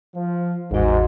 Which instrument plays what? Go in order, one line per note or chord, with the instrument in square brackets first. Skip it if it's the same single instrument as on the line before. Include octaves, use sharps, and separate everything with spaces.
[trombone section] F3
[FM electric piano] A1 E2 F#4 [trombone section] G#2